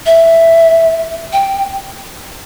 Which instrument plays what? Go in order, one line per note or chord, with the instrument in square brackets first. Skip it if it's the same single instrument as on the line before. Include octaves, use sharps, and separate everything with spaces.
[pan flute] E5
G5